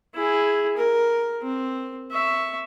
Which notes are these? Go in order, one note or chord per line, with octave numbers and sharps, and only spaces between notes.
E4 G#4
A#4
C4
E5 C#6